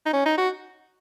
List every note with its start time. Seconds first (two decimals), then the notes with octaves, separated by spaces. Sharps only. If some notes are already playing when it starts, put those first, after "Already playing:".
0.06 D#4
0.13 C#4
0.26 D#4
0.38 F#4